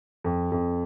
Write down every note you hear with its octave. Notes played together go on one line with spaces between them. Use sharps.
F2
F2